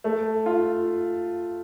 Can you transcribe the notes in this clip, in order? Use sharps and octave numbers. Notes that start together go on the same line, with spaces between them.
A3
F4